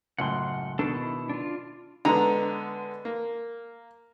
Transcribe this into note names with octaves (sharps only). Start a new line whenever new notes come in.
C#2 F#2 A2 F#5 C6
B2 D#3 D4 A4
E4
D4 F4
D3 G#3 B3 A#5
A#3